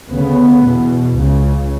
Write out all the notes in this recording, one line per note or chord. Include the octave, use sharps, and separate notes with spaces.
D2 C#3 B3
E2 B2
C#2 C#3